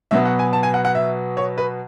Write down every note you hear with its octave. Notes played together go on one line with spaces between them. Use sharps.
B2 F#3 B3 E5
F#5
G#5
A5
G#5
F#5
F#5
E5
C#5
B4